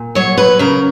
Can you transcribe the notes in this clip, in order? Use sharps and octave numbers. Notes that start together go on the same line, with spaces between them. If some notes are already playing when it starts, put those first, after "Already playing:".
Already playing: A#2
F#3 C#5
B4
C#3 A#4